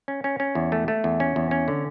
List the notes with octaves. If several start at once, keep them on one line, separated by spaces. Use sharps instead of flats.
C#4
C#4
C#4
E2
A3
A3
E2
C#4
E2
C#4
D3